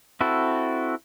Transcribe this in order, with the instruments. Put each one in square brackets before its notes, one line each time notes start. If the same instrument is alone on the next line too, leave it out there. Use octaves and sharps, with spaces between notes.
[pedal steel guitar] C4 E4 F#4 A4